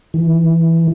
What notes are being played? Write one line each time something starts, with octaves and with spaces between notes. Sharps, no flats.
E3